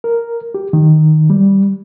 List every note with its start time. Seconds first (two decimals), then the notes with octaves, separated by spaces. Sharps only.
0.04 A#4
0.55 G4
0.73 D#3
1.30 G3